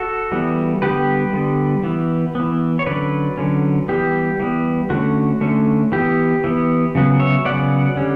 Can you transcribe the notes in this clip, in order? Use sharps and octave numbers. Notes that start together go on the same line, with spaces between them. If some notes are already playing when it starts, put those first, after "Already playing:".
Already playing: F#4 A4
E3 G3 B3
D3 G3 B3 G4 B4
D3 G3 B3
E3 B3
E3 B3
C#5
D3 F#3 C#4 B4 D5
D3 F#3 C#4
E3 G3 B3 G4
E3 G3 B3
D3 A3 C#4 F#4
D3 A3 C#4
E3 B3 G4
E3 B3
C#3 F#3 B3
C#5 E5
C#3 F#3 B3 D5 F#5
D3 G3 C#4